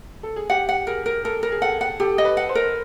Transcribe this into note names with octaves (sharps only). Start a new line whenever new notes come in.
A4
G#4
G4 F#5
F#5
G#4 A#4
A#4
A4 A#4
A#4
G#4
A4 F#5
F#5
G4 A4
D#5
B4
F#5
C5
A#4